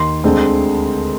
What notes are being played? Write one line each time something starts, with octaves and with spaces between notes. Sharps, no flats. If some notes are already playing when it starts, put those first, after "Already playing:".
Already playing: D#2 D#3 C6
D2 D3 G#3 C4